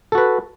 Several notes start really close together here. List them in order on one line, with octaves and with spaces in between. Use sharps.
A4 F#4 B4